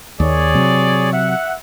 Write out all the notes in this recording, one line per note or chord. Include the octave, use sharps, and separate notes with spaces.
D#2 G#4 C#5 D5
C3 F#3
E5 F#5